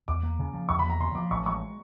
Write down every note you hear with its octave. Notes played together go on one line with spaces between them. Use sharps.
E2 D6
A#3
C#3
F3
E2 C#6
B5
A#3
A#5
C#3 C6
F3 D6
A1 C#6
G#3 C#6